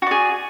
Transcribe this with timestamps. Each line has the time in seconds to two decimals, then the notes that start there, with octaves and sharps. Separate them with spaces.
0.02 F#4
0.07 D5
0.11 G#4